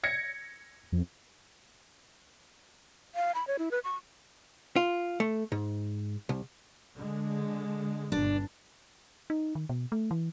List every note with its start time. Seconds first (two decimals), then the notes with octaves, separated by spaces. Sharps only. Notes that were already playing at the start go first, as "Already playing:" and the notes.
0.04 G#6 A#6 C#7
0.92 F2
3.15 F5
3.35 B5
3.47 C#5
3.59 E4
3.71 B4
3.84 C#6
4.76 F4
5.20 A3
5.52 G#2
6.29 C2
6.96 D3 G#3
8.12 G1 B2 D4
9.30 D#4
9.55 D#3
9.69 B2
9.92 A3
10.11 E3